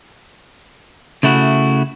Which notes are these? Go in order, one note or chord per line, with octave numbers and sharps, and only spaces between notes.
C#3 A3 E4 F#4